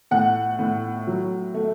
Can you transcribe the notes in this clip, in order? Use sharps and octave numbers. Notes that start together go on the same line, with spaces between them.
A2 F#5
A2
F#3
A3